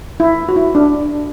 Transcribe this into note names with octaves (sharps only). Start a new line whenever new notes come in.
E4
F#4
E4
D4